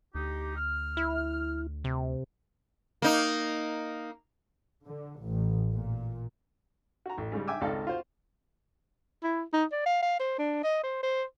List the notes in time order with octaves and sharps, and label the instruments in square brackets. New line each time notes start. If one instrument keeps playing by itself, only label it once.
[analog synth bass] D2 [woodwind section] D#4 G4
[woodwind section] F6
[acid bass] E4
C3
[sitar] A#3 D#4
[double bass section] D3
A1
A#2
[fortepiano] F#4 A#5
A1
G#2 C#3 G3
E5 G5 G#5 D6 E6
G#1 C#2 D#4 A4 D5 F5
F4 F#4 C5
[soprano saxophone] E4
D#4
D5
F5
F5
C5
D4
D#5
C5
C5